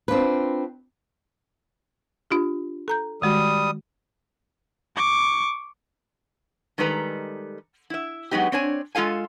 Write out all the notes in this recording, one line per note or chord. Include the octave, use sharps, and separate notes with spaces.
C4 D4 F4 B4
D4 F4 G4
A4 A#5 G6
D#3 G3 G#3 F#4 D#6
C#6 D6
D#3 G3 G#3 A4 B4 A#5
E4 E5
F#3 G#3 B3 D#4 G4
C4 D4 C#5 G#5
G#3 F4 A4 F5 G#5